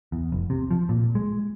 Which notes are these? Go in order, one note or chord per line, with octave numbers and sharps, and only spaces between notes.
E2
F1
C3
F3
A#2
G#3